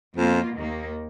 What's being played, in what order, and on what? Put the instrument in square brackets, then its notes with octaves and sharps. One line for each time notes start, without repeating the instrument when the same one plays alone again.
[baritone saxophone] F2 [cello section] B2 A#3 F4
[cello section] D#2 D#3 A#3